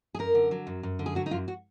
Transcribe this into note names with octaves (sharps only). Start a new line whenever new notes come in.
G#4
F#2 A#4
D3
F#3
F#2
F#2
D3
G#4
F#3 F#4
D#4
F#2 F4
F#4